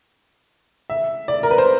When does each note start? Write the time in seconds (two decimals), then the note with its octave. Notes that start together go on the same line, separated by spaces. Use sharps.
0.90 E5
1.28 D5
1.43 A#4
1.51 B4
1.58 C5